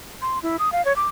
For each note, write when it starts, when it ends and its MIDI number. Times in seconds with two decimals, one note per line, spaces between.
0.22 0.39 84
0.43 0.57 64
0.59 0.72 87
0.72 0.84 77
0.85 0.95 73
0.96 1.08 86